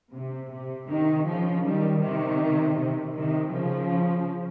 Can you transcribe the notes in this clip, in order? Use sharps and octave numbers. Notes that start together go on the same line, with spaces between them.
C3
C3
C3 D#3
C#3 F3
D#3 G3
C3 D#3
C3
C3 D#3
C#3 F3